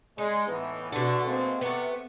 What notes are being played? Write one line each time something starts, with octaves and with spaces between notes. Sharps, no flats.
G#3 D#4
A2 E3 B3
B2 D3 A3
G#3 A#3 C4
C3 A3 B3